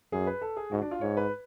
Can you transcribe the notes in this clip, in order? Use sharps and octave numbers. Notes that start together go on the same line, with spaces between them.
F#2 G#4
B4
A4
G#4
G#2 F#4
D4
F4
G#2 C#5
B4